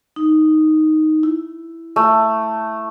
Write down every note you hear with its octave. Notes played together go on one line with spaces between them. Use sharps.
D#4
E4
A3